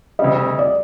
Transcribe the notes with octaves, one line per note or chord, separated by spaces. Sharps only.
D2 C3 G3 D#5
D5